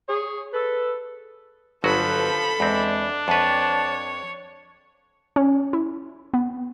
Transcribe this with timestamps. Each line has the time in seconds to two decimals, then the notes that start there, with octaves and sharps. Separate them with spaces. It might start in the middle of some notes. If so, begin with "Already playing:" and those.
0.09 G#4 C#5
0.54 A4 B4
1.84 G1 F3 F#3 F#4 A4 B4 B5
2.60 E2 G#3 C4 D4
3.28 F2 B4 C#5 A5
5.36 C#4
5.73 E4
6.34 B3